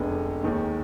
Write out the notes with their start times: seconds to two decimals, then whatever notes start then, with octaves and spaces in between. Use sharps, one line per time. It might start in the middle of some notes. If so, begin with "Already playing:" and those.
Already playing: F1 F2 D3 G#3 B3
0.43 D#2 D#3 G#3